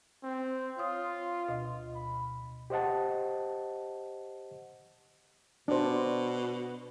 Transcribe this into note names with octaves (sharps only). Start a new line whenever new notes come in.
C4
F4 C#5 D#6
D2 B2 D#5
B5
G4 C5 D#5 F#5 A5
B2 D4 C5